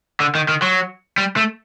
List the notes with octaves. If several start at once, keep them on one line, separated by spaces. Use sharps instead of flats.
D3
D#3
D#3
F#3
G3
A3